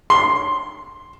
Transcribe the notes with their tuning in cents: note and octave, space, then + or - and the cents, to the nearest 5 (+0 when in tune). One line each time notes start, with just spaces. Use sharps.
C6 +5